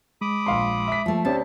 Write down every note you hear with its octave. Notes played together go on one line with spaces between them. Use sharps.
G#3 B5 D6 D#6
A#1 F5 C6
E5 B6
F3 A3
D2 C4 C#4 G4 A5